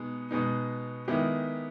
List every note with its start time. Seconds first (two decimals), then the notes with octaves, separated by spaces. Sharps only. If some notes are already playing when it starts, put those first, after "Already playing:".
Already playing: B2 G#3 B3 D#4
0.31 B2 G#3 B3 D#4
1.08 D#3 G#3 B3 E4 G4